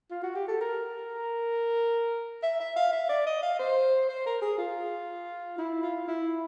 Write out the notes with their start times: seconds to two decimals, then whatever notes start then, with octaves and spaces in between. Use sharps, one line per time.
0.11 F4
0.23 F#4
0.35 G4
0.48 A4
0.61 A#4
2.43 E5
2.60 E5
2.76 F5
2.92 E5
3.09 D5
3.27 D#5
3.42 F5
3.59 C5
4.09 C5
4.26 A#4
4.42 G#4
4.58 F4
5.58 E4
5.83 F4
6.08 E4